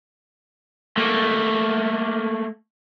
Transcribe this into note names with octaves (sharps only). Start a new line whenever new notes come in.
A3 A#3